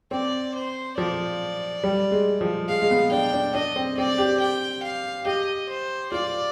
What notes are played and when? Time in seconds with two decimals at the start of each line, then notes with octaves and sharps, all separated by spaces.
0.11 C4 D5
0.54 C5
0.97 F3 D5
1.84 G3
2.11 G#3
2.41 F3
2.69 G#3 F5
2.81 G#3
2.91 B3
3.12 D4 G5
3.33 D4
3.55 D4 D#5
3.76 C4
3.98 C4 D5
4.18 G4
4.40 G5
4.83 F5
5.25 G4 D#5
5.69 C5
6.12 F4 D5